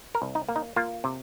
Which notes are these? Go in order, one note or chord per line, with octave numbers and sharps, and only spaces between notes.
A#4
C2
D#4
A#3
D#4
A#3 F4
C3